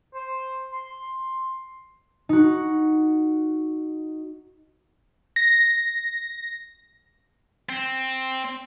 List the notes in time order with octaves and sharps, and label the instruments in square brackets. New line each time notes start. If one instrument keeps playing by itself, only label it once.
[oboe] C5
C6
[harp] D#4 F#4
[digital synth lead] A#6
[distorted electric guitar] C4